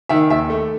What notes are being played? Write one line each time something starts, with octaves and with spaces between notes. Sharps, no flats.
D#3 E5
D#2 E5
A3